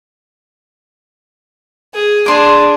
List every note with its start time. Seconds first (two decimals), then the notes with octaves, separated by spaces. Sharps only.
1.94 G#4
2.26 D4 G#4 C6 D6